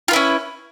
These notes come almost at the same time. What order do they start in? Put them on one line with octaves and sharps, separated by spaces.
F4 B4 E4 C#4